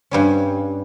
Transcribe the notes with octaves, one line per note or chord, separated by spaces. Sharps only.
G2 G3 C#4